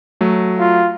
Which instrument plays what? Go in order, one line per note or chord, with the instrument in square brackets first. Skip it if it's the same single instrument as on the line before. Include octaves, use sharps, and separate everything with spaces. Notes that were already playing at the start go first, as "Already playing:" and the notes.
[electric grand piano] F#3 A3
[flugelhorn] F4